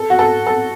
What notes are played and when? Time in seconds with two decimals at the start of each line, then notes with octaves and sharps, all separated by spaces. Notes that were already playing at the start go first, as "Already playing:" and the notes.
Already playing: A4
0.10 F#4
0.19 A4
0.47 A4